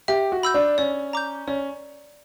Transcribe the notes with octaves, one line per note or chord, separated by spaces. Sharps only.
G4 E5
F#4
B5 E6 G6
D4
C#4 D5
A#5 D6 G6
C#4 D5